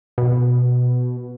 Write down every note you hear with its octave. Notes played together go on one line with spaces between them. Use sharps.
B2